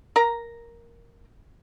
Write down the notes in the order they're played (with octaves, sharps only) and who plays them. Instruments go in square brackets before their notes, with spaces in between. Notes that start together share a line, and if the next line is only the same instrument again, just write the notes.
[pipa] A#4 A#5